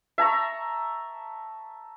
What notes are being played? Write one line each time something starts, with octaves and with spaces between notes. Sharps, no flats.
E5 A5 A#5 C#6